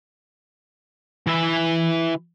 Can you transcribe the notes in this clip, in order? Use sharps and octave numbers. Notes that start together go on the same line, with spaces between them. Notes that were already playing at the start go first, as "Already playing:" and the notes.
E3 E5